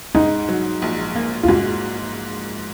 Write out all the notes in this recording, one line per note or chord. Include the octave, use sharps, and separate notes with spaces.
G#2 D#4
F#3
A#1
A#3
F4
G#2 F#4